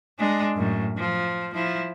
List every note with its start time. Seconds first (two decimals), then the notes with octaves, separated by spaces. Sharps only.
0.19 G#3 D4
0.56 F#2 A2
0.97 F3
1.54 F3 E4